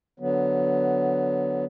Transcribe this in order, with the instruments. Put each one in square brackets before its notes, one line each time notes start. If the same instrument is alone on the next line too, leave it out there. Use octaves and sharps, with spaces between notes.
[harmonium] D3 F#3 B3